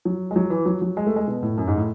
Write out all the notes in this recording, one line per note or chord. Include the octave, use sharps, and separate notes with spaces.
F#3
G#3
F#3
E3
F#3
F#3
G#3
A3
G#3
B2
A2
F#2
G#2
A2